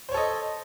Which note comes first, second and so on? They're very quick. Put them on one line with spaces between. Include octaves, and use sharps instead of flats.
C5 C#5 A4 D#5